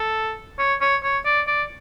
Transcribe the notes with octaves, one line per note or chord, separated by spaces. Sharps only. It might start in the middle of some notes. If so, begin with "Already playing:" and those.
Already playing: A4
C#5
C#5
C#5
D5
D5